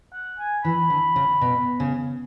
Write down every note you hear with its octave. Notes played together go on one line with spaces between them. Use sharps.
F#5
G#5
E3 B5
D3
C#3
B2
C#3